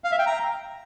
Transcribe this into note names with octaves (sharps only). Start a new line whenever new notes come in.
F5
E5
G5
A#5